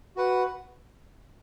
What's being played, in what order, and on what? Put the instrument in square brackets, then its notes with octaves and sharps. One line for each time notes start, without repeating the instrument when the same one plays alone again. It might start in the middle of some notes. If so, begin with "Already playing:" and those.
[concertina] F#4 B4 F#5